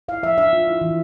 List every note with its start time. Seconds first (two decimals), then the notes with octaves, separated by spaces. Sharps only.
0.08 E4 F5
0.23 F3 E5
0.38 D4 E5
0.53 F4
0.67 E4
0.81 E3